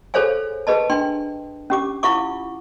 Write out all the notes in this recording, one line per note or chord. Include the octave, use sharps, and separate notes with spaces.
G#4 A4 C5 C#5 F5 G#5
G#4 B4 D#5 A5
D4 G5 C6
C#4 G4 D6
E4 F4 F5 F#5 C#6 D6